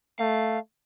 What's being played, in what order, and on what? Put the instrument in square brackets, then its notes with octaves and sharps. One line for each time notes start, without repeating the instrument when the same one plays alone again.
[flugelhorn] A3 [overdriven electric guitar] F5